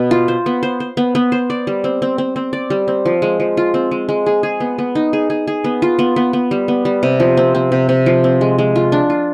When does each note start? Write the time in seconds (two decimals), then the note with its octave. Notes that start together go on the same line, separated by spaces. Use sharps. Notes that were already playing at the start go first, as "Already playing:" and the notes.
Already playing: B2 B3
0.11 F4
0.28 C5
0.46 B3
0.63 C5
0.80 C5
0.97 B3
1.15 B3
1.32 C5
1.50 D5
1.67 G3
1.84 C4
2.02 C4
2.18 C4
2.36 C4
2.53 D5
2.70 G3
2.88 C4
3.05 F3
3.22 G#3
3.40 F3
3.57 F4
3.74 C4
3.91 G#3
4.09 G#3
4.26 G#4
4.43 G#4
4.60 B3
4.78 B3
4.95 D#4
5.13 G#4
5.30 G#4
5.47 G#4
5.64 B3
5.82 F4
5.99 B3
6.16 B3
6.33 B3
6.51 G3
6.68 B3
6.85 G3
7.03 C3
7.20 F3
7.37 C4
7.55 C4
7.72 C3
7.89 C3
8.06 F3
8.24 C4
8.41 G#3
8.58 G#3
8.76 F4
8.92 D4
9.10 F4